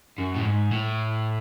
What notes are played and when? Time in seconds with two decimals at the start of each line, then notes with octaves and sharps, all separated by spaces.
0.18 F#2
0.35 A2
0.45 G#2
0.72 A2